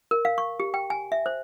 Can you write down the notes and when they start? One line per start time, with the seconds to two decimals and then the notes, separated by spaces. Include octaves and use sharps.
0.11 A#4
0.25 F5
0.38 C#6
0.60 G4
0.74 G5
0.90 G#5
1.12 E5
1.26 C5